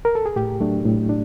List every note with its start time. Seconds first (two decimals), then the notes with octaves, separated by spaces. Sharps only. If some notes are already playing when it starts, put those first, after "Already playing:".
0.05 A#4
0.15 A4
0.26 G#4
0.36 A2 G4
0.60 F#3 A3 D4
0.85 A2
1.09 D4